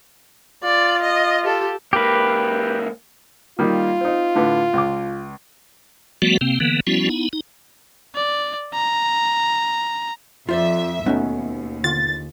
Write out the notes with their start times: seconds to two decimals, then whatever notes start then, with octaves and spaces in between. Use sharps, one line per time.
0.64 F4 D5
1.02 D#5
1.43 G4 A4
1.93 C#2 A#3 G4 B4
3.59 D#3 G3 A#3 F4
4.01 C4 D#4
4.35 A2 D3 B4
4.73 C#2 D6
6.22 F3 G3 A3 B3 F#4
6.41 C3 A#3 C4
6.60 D3 E3 A#3 B3
6.87 F3 G3 B3 C#4 E4 F#4
7.09 B3 D#4 E4
7.33 D#4
8.15 D5
8.73 A#5
10.49 F2 F4 C5 D5 E5
11.06 D#2 B2 A3 B3 C#4 D#4
11.84 D3 F4 A6